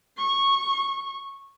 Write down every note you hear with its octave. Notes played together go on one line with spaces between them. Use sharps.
C#6